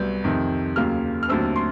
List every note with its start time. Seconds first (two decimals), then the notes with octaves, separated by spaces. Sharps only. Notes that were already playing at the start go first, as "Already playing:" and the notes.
Already playing: C2 F#3 B3 G6
0.24 F2 C3 D#3
0.76 D#2 C#3 F#3 A#3 F6
1.23 F6
1.29 D#2 D3 F#3 A3 C4 E6
1.56 C6